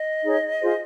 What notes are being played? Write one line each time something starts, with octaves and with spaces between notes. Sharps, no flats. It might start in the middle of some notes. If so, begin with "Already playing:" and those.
Already playing: D#5
D#4 G#4 C#5
F4 G#4 C5